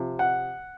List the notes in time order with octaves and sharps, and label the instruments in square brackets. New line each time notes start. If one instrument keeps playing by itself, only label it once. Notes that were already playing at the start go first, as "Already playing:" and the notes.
Already playing: [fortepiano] C3 F3
F#5